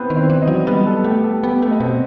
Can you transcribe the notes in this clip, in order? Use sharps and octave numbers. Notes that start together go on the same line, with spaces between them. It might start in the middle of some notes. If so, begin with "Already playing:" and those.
Already playing: B3 C4 E4 B4 C5
D#3
C4 C5
E3
D#4 D#5
F#3
G3 B3 B4
A4
A3 G4
A4
B3 G4
A3 A4
D#5
B2 C4 C5